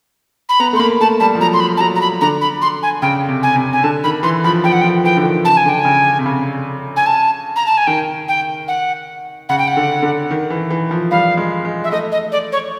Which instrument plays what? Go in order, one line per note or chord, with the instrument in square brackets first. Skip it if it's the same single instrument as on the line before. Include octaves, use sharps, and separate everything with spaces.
[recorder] B5
[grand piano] B3 [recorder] A#5
[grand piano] A3
[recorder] C6
[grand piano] A#3 [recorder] B5
[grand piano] A3 [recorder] A5
[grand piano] G3 [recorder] A5
[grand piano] F3
[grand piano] F#3 [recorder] A#5
[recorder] C6
B5
A5
[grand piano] F#3 [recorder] A#5
[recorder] A#5
B5
[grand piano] D3 [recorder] A#5
[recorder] B5
C6
G#5
[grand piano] C#3 [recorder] G5
[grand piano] C3
[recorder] G#5
[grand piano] C3
[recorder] G#5
[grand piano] D3 [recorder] A5
[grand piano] D#3 [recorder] B5
[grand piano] E3 [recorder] C6
[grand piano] F3 [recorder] B5
[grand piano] F3 [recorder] G5
[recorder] F#5
G5
[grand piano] F3
[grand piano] E3 [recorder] G5
[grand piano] D3
D#3
[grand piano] C#3 [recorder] A5
[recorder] G#5
[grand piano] D3 [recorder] G5
[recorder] G#5
[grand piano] C#3
C3
C#3
[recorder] G#5
A5
A#5
A5
G#5
[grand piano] D#3 [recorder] G5
[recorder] G5
F#5
[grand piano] C#3 [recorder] F#5
[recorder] G5
F#5
[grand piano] D3
D3
D#3
E3
E3
F3
[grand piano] G3 [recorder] F5
[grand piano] G#3
G#3
[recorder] E5
[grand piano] A3 [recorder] D#5
[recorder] D#5
D5
C#5